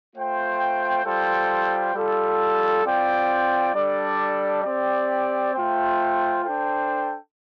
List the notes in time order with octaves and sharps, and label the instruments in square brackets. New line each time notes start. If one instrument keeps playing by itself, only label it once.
[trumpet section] A3 F4 C5 G5
G3 F4 A4 C5 G5
G3 F4 A4
C4 F4 D5 G5
G3 D4 A4 D5
C4 G4 D5
A3 F4 C5 G5
D4 A4 C5 G5